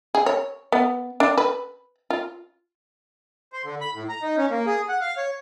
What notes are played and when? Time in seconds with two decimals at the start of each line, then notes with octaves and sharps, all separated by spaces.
0.15 G#4
0.26 C#5
0.72 B3
1.20 D4
1.38 B4
2.10 F4
3.53 C5
3.64 D3
3.81 B5
3.94 A2
4.09 A#5
4.22 D#4
4.37 C#4
4.50 A#3
4.66 G#4
4.89 F#5
5.01 F5
5.17 C#5